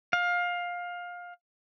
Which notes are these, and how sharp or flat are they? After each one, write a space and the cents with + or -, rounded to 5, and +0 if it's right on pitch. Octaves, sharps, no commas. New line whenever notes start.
F5 +20